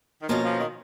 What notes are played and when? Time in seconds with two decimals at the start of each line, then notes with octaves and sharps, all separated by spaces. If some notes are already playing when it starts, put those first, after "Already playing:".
0.22 D#3
0.29 B2 F3 A#3 C#4 F4
0.44 F3
0.59 D#3